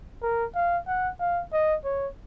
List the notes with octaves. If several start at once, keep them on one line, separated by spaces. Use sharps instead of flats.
A#4
F5
F#5
F5
D#5
C#5